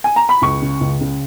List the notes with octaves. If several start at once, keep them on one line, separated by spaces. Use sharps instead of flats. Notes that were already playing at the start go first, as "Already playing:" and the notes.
G#5
A#5
B5
C#2 C#6
C#3
C#2
C#3